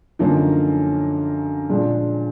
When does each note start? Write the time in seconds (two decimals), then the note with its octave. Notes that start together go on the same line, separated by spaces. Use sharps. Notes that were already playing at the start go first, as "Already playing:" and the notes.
0.19 F#2 D3 F3 A#3 D#4
1.69 A#2 F3 G#3 D4